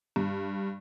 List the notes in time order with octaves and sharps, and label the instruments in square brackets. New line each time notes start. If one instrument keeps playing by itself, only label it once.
[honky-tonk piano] G2